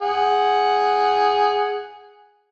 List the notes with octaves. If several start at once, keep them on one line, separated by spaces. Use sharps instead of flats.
G#4 F#5